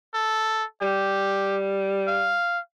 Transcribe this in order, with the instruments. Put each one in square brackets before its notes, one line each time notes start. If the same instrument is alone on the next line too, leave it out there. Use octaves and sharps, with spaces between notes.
[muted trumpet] A4
[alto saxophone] G3 [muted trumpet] G4
[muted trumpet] F5